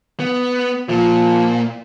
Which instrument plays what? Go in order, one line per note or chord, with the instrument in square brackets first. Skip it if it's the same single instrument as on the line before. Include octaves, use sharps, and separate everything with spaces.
[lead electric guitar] B3
[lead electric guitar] A#2 [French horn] F3